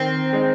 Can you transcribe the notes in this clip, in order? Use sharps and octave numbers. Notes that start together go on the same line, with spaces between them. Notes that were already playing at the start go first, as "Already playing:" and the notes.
Already playing: D#3 C4
G#3 D#4